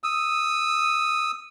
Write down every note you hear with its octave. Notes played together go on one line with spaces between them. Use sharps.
D#6 E6